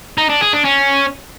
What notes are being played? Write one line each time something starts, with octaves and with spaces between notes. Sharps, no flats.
D#4
D4
G#4
D4
C#4